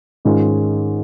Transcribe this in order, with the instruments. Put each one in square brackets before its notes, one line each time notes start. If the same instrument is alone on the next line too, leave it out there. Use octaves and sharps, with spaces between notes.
[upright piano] G#2 D#3 G#3 C#4 F4